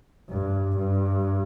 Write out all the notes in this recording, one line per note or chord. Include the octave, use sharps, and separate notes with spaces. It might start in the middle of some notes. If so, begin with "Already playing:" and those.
G2
G2